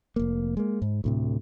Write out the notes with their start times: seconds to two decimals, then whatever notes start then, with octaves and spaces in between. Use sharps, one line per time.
0.16 F1 A#3
0.57 G#3 A#3
0.82 G#2
1.04 D2 A2 C3